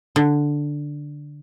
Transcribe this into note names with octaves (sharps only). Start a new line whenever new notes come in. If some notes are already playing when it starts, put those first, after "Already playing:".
D3